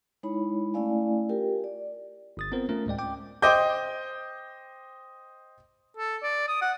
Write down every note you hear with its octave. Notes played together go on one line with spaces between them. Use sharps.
G#3 D#4 E4 C#5 B5
A3 C#4 E4 D5 F5 G#5
F4 G4 A#4 G5
D5
G1 D#6 A6
B3 C4 F4 A#4 C5
A3 C#4 F4 A#4
D2 A2 G#3 D5 G5
G5 D6
C5 D#5 G5 D6 G6
A4
D5
D#6
F#5